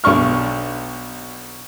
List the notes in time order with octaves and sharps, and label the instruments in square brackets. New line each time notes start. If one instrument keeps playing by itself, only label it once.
[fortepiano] B1 D4 C#6 F6